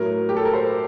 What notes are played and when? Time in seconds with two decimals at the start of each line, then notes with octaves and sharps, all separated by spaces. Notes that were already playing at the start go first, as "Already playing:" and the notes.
Already playing: A2 F#3 A#4
0.29 G4
0.37 A4
0.45 A#4
0.53 C5